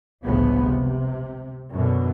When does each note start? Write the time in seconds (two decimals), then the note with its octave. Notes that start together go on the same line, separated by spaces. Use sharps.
0.24 G1 C#2 A2 F3 B3
0.64 C3
1.72 F#2 B2 D3